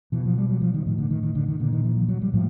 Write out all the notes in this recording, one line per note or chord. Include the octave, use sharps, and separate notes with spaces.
B2 E3
F3
G3
F#3
F3
D#3
A2 D#3
D3
D#3
D#3
D3
D#3
A#2 D3
D#3
E3
F3
F#3
G3
A2 F3